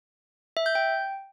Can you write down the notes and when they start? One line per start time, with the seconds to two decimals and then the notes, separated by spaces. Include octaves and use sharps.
0.57 E5
0.66 G6
0.75 G5